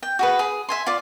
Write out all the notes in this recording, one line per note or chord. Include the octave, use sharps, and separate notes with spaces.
G5
F#4 G#4 B4
G#4
E5 G#5 C6
F4 D5